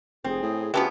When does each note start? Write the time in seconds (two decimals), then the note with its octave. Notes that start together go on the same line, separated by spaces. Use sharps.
0.24 F1 C4 G#4
0.42 A2
0.74 C#3 E3 F3 B3 C#4 F#4 G4 B4